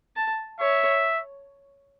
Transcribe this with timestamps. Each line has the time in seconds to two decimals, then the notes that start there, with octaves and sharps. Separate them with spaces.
0.16 A5
0.60 C#5 E5